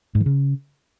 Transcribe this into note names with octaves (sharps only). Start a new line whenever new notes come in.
G#2
E3
C#3